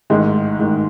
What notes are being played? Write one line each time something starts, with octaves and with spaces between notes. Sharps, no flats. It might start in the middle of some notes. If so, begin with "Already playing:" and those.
A1 G#2 D#3 G#3
A1 G#2 D#3